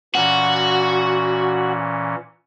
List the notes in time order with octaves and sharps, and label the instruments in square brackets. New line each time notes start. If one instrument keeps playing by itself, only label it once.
[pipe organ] A#2 E3 C#4 [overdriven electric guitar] F#4